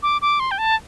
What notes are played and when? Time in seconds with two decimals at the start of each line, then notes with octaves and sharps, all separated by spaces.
0.03 D6
0.22 D6
0.40 C6
0.51 G5
0.58 A5